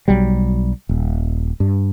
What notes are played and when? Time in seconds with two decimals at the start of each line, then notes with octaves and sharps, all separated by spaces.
0.08 B1 F#3 G3
0.89 D#1
1.60 G2